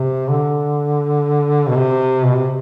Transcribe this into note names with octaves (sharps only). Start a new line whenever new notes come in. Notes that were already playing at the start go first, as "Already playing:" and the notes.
Already playing: C3
D3
B2
C3
B2
C3